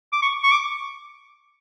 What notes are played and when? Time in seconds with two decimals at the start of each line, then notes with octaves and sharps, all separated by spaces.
0.13 D6
0.22 C#6
0.43 C#6
0.52 D6